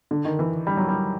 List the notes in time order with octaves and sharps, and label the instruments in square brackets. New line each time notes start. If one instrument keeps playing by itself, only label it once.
[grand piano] D3
D#3
E3
G3
F#3
G3